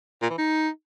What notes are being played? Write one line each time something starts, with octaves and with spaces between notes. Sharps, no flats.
A#2
E3
D#4